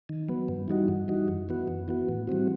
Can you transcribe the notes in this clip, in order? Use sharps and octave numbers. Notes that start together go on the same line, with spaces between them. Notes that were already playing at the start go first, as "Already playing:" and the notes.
D#3
F#3 B3
G2
E3 G3 D#4 F#4
G2
E3 G3 D#4 F#4
F#2
E3 B3 F#4
F#2
E3 B3 F#4
A2
E3 G3 C4 F#4